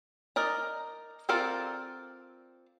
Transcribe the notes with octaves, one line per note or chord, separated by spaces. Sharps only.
D#4 A#4 D5 A#5
C4 F4 A4 A#4 D5